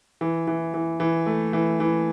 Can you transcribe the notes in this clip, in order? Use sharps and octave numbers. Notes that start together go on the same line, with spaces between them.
E3
E3
E3
E3
A3
E3
E3